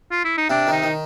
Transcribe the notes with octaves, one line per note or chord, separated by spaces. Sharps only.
F4
E4
D#4
C3 D4
D#3
D#4
D#3